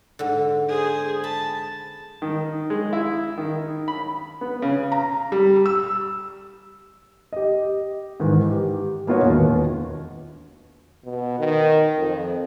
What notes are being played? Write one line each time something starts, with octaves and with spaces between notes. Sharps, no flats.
G#2 D3
G#4 C5
A5 B5
D#3
G#3
E4
D#3
B5
B3
C#3
A#5
G3
E6
G4 D#5
G#2 D#3 E3
G4
A#3 B3 F4 F#4 C#5
E1 D#2
B2
D#3
F2